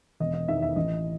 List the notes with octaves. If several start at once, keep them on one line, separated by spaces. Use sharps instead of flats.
E1 D#5
D#5
E2 D#3 E5
E5
A1 D#5